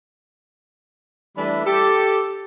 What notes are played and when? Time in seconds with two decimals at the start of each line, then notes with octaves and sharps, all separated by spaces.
1.37 E3 G3 A3 D4 E5 B5
1.66 G4 A4